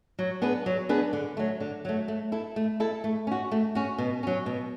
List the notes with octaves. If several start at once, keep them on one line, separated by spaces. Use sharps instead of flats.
F#3
B3 D4 G#4 B4
F#3
B3 D4 G#4 B4
D3
F#3 A3
D3
F#3 A3
A3
E4 A4
A3
E4 A4
A3
C#4 F#4
A3
C#4 F#4
B2
F#3 C#4
B2